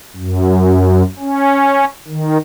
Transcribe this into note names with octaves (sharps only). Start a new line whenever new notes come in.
F#2
C#4
D#3